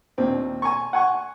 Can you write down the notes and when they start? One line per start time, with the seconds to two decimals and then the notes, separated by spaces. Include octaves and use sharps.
0.18 D#2 A#2 C4 D4
0.62 G#5 A#5 C#6
0.93 F#5 G#5 C#6